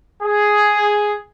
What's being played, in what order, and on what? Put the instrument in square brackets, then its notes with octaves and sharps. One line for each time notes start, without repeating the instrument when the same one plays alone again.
[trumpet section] G#4